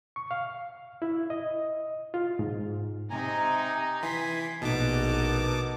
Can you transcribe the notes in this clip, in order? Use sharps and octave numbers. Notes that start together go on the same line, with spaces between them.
C#6
F5
E4
D#5
F4
G#2
C3 D#4 G#5 A#5
E3 G#5 C6 B6
A#1 B2 A3 B3 D#4 A5 D6